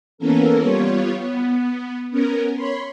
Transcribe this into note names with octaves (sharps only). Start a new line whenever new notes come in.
E3 A#3 B3 C#4 A4 A#4
G3 B3 F4 C#5
B3
B3 C#4 A#4
C#5 B5 C6